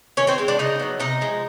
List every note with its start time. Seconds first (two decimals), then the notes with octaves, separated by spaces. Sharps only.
0.17 D#3 C#4 C#5
0.27 C4 C5
0.38 G#3 C4
0.48 D4 D5
0.59 C#3 D#4 D#5
0.79 F#3 B3
1.00 C3 D#4 D#5
1.21 F3 G#3